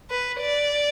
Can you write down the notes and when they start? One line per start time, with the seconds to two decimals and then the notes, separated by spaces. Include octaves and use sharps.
0.10 B4
0.40 D5